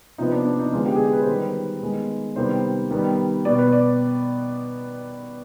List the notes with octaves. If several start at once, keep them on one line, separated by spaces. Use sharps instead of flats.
C3 F3 B3 D#4
D4
D4
D#4
D3 F3 G#3 B3 F4
G4
G#4
G4
B4
C5
D#3 G3 B3 B4
D#3 G#3 B3
C3 D#3 G3 B3 C5
D#3 G3 B3
B2 B3 D5
B4
D5